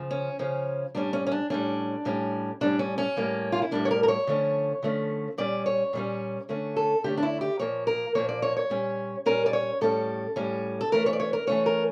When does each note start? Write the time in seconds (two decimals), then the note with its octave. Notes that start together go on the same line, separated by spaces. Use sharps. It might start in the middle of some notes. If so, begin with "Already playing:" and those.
Already playing: C#3 F3
0.11 C#4
0.39 C#3 F3 C#4
0.95 A2 G3 C#4 D4
1.13 C#4
1.27 C#4
1.32 D4
1.50 A2 G3 C#4 D4
2.05 A2 G3 C#4
2.61 A2 G3 C#4 D4
2.79 C#4
2.98 C#4
3.17 A2 G3 A#3
3.52 F4
3.62 E4
3.71 A2 G3 A#3 D4
3.85 C#5
3.91 A#4
4.03 A#4
4.08 C#5
4.27 D3 F3 A3 C#4
4.83 D3 F3 A3 C#4
5.38 A#2 G3 C#4 D5
5.66 C#5
5.93 A#2 G3 C#4
6.49 D3 A3 C#4
6.76 A4
7.04 D3 A3 C#4 G4
7.17 D4
7.23 E4
7.41 G4
7.59 A#2 F3 A#3 C#5
7.87 A#4
8.15 A#2 F3 A#3 C#5
8.29 D5
8.42 C#5
8.57 C#5
8.70 A#2 G3 C#4
9.26 A#2 G3 C#4 A#4
9.46 D5
9.53 C#5
9.81 A2 G3 C#4 A4
10.36 A2 G3 C#4
10.81 A4
10.92 E3 A3 C#4 A#4
11.06 C#5
11.13 D5
11.20 C#5
11.33 A#4
11.47 E3 A3 C#4 C#5
11.66 A#4